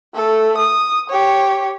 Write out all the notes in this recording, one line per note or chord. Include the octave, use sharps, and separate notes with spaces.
A3 A4
D#6
G4 C#5